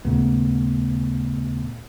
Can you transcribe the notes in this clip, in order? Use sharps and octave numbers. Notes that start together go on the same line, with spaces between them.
D#2 A#2 C#3 A3 B3